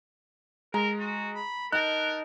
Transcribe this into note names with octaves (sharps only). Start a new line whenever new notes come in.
G#3 A#4 A#5
F#4
B5
D#4 A#4 A5 F#6